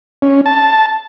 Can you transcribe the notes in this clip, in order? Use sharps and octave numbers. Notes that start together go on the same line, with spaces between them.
C#4
A5